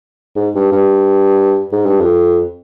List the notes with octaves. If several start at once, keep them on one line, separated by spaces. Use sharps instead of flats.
G#2
G2
G2
G#2
G2
F2